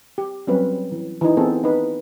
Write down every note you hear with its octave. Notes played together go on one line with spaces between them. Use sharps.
G4
F#3 G3 C4 C#4 B4
E3
E3 D#4
B3 C4 G#4 A4
D#4 B4